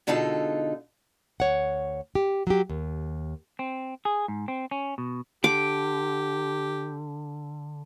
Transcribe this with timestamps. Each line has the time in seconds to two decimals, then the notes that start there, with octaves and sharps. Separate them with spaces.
0.07 B2 D3 G#3 D#4 F4 A4
1.40 D2 C#5 F#5
2.15 G4
2.47 F#3 G4
2.70 D#2
3.59 C4
4.05 G#4
4.28 G#2
4.48 C4
4.71 C#4
4.98 B2
5.44 D3 G4 D6